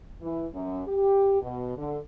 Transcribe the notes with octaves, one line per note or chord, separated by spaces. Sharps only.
E3
F#2
G4
B2
D3